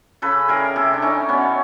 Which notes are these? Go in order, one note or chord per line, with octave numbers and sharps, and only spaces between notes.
C#3 A4 B4
E3 G3 G#4 A#4
C3 G4 A4
D4
E3 G3 C#4 D#4
B2 B3 C#4